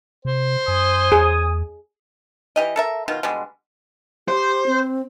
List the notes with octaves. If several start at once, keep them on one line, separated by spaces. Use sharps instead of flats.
C3 C5
F#2 G#5 D#6
E2 G#4
E3 G4 D#5
A4 A#4 E5
B2 D#3 F4
B2 D3 G3 G#3
G4 C5
C4